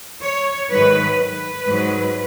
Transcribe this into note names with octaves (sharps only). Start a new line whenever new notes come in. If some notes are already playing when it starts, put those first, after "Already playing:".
C#5
G#2 D#3 F#3 B4
B4
G#2 F#3